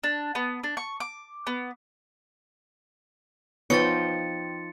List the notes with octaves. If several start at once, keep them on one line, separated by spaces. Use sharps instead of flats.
D4
B3
D4
C#6
D6
B3
F3 B3 D#4 C#5 G5 B5 A6 C#7